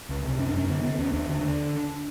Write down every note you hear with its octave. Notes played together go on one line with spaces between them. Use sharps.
C#2
C3
F#2 C#4
D4
F#2 C#4
D3 B3
D3 B3
D#2 C#4
D#2 D4
D3
D3